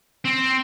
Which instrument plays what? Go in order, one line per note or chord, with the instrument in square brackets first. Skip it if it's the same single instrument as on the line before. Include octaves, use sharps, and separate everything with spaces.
[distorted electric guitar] C4